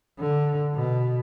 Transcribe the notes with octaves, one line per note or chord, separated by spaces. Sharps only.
D3
B2